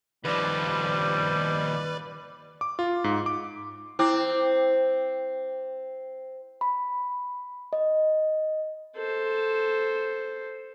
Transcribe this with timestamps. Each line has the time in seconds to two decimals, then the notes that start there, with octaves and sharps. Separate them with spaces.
0.25 D#2 F3 G3 B4 D5
2.61 D6
2.79 F4
3.04 G#2
3.26 D6
3.99 C4 E4 C5 D6
6.61 B5
7.73 D#5
8.96 A4 C5